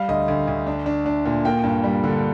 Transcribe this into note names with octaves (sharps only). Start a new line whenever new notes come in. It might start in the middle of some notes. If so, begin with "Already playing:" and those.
Already playing: G3 F5
D2 D#5
D2
D2
D4
D4
D4
A#2
A#3 G5
G2
G3
D3